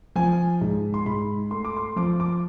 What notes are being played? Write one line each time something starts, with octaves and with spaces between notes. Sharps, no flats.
F3 G#5
G#2
C6
G#2 B5
A3 C6
D6
C6
F3 D6
D6